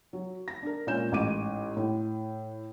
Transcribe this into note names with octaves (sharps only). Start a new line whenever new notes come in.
F#3
A#6
D4 A#4
A#2 G#3 C#4 G6 E7
A1 G#2 D6 D#7
A2